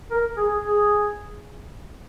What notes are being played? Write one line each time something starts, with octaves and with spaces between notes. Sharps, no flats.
A#4
G#4
G#4